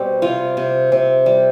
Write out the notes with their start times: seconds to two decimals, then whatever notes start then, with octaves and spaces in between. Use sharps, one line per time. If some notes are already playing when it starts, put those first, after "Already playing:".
Already playing: B2 G3 C4 G4
0.22 C3 F4
0.57 C3
0.92 C3
1.26 G3